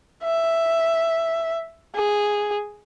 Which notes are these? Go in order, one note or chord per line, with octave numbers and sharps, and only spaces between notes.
E5
G#4